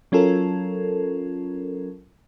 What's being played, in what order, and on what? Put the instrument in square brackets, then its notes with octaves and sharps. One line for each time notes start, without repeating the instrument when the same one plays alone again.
[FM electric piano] F#3 C#4 F4 A4 A#4